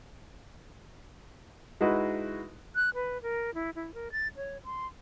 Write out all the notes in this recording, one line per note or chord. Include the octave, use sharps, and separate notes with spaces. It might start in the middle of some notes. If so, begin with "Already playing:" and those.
G#3 D#4 E4 F#4 B4
F#6
B4
A#4
E4
E4
A#4
A6
C#5
C6